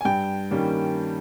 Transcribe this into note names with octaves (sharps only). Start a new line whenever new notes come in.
G#5
G2 G5
D#3 G3 A#3 C#4